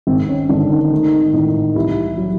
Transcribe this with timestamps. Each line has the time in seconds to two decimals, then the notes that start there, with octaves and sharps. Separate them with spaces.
0.07 G#1 C4
0.28 C#4
0.49 G#1 D3 D4
0.70 D#3 D#4
0.91 D#3 A3 D#4
1.33 A2 D#3 D#4
1.75 C2 E3 E4
2.17 F#3